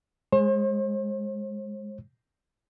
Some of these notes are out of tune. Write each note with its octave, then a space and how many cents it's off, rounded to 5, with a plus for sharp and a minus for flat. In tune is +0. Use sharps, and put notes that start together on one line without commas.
G#3 +0 C5 +45